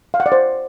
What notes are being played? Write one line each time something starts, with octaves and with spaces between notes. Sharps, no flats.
F5
F#5
D5
C5